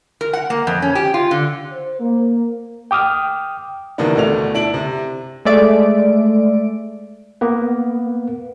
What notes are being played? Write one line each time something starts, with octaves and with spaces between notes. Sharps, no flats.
A#4
F#5
A#3
F2
C#4
G4
F4
D3
C5
A#3
G5 D6 D#6 F6
C3 D#3 E3 A#3 B3 D4
D2 B2 A3 D5 F7
D4 E4 D7 F#7
C3
G#3 A3 D5 E5 D7
A#3 B3 B4